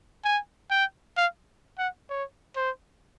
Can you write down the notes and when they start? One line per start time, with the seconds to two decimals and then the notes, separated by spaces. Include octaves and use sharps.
0.24 G#5
0.71 G5
1.17 F5
1.78 F#5
2.10 C#5
2.56 C5